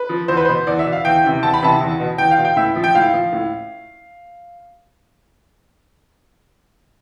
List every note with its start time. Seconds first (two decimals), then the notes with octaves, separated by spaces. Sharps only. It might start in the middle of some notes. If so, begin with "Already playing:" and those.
Already playing: B4
0.09 F3
0.28 E2 C5
0.37 B4
0.45 B2 C5
0.67 E2 D5
0.79 E5
0.85 B2
0.92 F5
1.05 E2 G5
1.24 C3 E3
1.42 E2 A5
1.54 B5
1.62 C3 E3 A5
1.81 E2
2.00 B2
2.18 E2 G5
2.31 F5
2.38 B2
2.45 G5
2.57 A2 E5
2.76 F3
2.84 G5
2.95 A2 F5
3.14 F3
3.33 A2